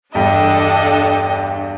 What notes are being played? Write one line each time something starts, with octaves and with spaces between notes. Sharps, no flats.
E2 G2 D4 A4 D#5 G5